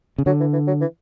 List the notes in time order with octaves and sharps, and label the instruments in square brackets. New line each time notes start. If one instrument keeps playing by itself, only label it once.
[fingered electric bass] C#3
[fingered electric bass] D3 [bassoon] F#3
[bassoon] E3
E3
F#3
E3